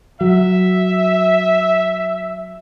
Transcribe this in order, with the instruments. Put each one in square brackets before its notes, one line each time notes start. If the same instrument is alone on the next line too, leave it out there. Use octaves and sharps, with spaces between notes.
[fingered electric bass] F#3 [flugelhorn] E5